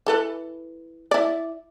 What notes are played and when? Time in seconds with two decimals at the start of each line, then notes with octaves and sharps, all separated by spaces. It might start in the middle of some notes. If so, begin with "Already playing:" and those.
0.07 E3 A4 B4
1.11 E4 D5